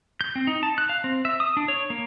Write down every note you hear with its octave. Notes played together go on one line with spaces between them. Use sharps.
G6
C4
D#4
A5
F#6
F5
C4
E5
D#6
D4
C#5
A#3